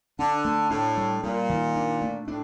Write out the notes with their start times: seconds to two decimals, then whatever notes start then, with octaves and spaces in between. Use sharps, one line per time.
0.19 D3 D4
0.45 A3
0.71 A2 D4
0.97 G3
1.23 A#2 G3
1.49 D#3
1.76 D4
2.01 A3
2.28 A2 D4